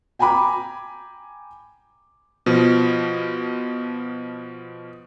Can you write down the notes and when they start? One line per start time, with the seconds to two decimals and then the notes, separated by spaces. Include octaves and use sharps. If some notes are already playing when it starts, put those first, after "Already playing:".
0.19 G5 G#5 A#5 B5 D6
2.46 B2 F3